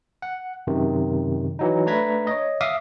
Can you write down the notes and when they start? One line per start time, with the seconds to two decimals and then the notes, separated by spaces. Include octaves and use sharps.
0.22 F#5
0.67 F#2 C3 D#3
1.59 E3 F#3 D#4
1.86 A3 D4 B4 A#5 G#6 B6
2.27 C#5 D#5
2.61 E5 F5 D6 D#6